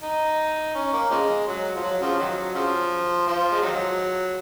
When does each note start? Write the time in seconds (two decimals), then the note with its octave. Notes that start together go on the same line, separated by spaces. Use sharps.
0.03 D#4
0.75 C#4
0.93 A#3
1.10 C#3 F3 G#3
1.47 F#3
1.76 F3
1.83 F#3
2.01 C#3 F3
2.19 D#3 F#3
2.55 C#3 F3
3.27 F3
3.51 G#3
3.62 D#3 F#3